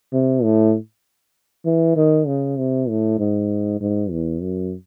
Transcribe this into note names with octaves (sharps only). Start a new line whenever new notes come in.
C3
A2
E3
D#3
C#3
C3
A2
G#2
G#2
E2
F#2